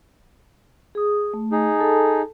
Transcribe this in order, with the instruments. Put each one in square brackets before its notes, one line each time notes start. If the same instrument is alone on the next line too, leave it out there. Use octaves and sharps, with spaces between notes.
[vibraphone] G#4 D#6
A3
[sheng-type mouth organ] D#4 G#4
[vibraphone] A4 A5